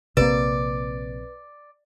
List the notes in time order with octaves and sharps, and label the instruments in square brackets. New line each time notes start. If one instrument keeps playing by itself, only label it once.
[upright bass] A#1 C4 [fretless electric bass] C3 A#3 [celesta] B4 [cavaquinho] D5